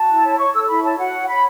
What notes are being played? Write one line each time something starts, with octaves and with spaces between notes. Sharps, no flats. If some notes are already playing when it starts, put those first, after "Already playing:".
Already playing: F#4 A5
E4
C#5
C#5 C#6
A4 E6
E4 B5
C#5 A5
F#4 F#5
C#5
C#5 B5